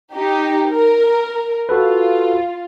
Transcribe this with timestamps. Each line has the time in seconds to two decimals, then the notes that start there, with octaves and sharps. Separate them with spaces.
0.13 D#4 G4
0.70 A#4
1.69 F4 F#4 A4 B4